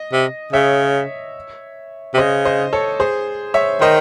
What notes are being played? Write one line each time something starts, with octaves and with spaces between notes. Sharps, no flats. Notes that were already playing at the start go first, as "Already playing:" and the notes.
Already playing: D#5
C3
C#3 C#5 E5
C3
C#3 C5 D#5
C5 D#5
A4 C#5
G#4 C5
C#5 E5
D#3 C5 D#5